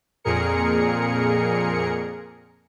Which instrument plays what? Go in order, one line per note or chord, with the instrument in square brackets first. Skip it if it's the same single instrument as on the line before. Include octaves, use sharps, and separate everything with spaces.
[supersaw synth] F2 A#2 G#4 A#4 C#7